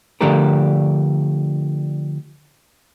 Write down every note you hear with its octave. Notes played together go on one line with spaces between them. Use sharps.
D3 F3 A3 D4 G4 A#4